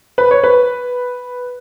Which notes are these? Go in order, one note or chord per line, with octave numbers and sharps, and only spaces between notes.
B4
C#5
B4